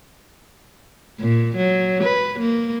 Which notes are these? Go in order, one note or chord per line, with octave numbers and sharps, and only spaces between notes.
A#2
F#3
B4
A#3